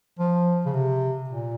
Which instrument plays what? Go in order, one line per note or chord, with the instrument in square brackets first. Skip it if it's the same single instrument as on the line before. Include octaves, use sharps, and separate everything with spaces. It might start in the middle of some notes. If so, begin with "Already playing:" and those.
[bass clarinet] F3
C#3
C3
A#2